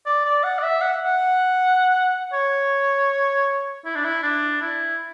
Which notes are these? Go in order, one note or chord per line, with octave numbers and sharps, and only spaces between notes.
D5
D5
F#5
D5
E5
F#5
F#5
C#5
E4
D4
E4
D4
E4